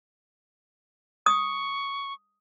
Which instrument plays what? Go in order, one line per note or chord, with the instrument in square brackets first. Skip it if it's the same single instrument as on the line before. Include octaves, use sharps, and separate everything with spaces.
[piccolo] C#6 [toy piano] D#6